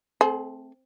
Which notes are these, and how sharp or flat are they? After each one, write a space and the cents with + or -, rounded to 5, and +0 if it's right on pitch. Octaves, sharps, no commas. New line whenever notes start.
A3 +0 C4 +0 G#4 +35